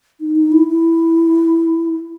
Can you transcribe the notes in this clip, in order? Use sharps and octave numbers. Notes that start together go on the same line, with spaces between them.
D#4
D#4
E4
E4